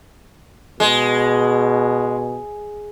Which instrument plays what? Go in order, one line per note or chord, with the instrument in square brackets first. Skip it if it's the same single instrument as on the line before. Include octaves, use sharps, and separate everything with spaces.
[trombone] B2 [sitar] G#3